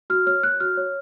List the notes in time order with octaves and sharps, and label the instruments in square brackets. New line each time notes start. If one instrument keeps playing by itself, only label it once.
[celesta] F#4 F6
C#5 F6
C#5 F#6
F#4 F6
C#5